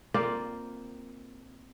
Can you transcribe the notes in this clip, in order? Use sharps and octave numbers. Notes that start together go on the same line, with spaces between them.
A#3 C4 F4 D5